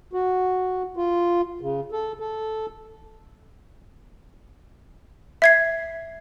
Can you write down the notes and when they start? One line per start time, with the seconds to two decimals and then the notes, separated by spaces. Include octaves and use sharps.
0.13 F#4
0.97 F4
1.61 C#3
1.92 A4
2.20 A4
5.42 E5 G#6 C7